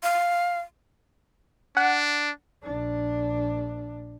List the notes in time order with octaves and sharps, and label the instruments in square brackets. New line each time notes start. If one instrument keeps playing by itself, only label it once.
[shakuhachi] F5
[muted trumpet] D4 [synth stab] F#5
[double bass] A#1 D4